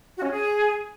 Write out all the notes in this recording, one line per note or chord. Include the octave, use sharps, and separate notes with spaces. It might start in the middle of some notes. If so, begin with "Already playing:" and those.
F#4
C#4
G#4